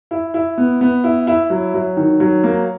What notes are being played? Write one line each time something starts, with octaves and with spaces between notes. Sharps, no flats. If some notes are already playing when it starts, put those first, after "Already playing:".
E4
E4
B3
B3
E4
E4
F#3
F#3
D#3
F#3
A#3